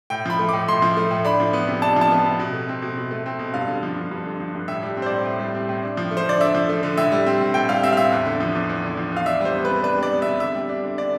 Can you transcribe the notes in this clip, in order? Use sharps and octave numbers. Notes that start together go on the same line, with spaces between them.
A2 G5
F3 B5
A3
A2 D6
A2 C6
F3
A3
A2
D4 B5
F3
B3
C3
D4 A5
F3 A5
B3
C3
B2
A3
C4
B2
B2
A3
C4
B2
G2 F5
D3
F3
G2
G2
D3
F3
G2
A2 E5
G3
C4
C5
D5
A2
A2
G3
C4
A2
D4
F3
A3
C5
D3 D5
D4 E5
F3
A3
D3
A2 E5
G3
C4
A2
A2 G5
G3 F5
C4 E5
F5
A2 E5
E2
D3
F3
E2
E2
D3
F3
E2 F5
D4 E5
G3 C5
B3
B4
C3
D4 B4
G3 D5
B3
C3 E5
D3 E5
G3
D4
D3
D3 D5